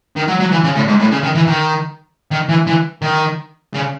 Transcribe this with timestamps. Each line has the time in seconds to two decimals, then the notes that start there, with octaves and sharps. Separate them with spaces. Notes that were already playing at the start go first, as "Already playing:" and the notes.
0.16 D#3
0.28 F#3
0.40 F#3
0.51 E3
0.63 C#3
0.75 A2
0.88 G#2
0.99 A2
1.11 C#3
1.23 D#3
1.35 E3
1.47 D#3
2.31 D#3
2.49 E3
2.67 E3
3.02 D#3
3.74 C#3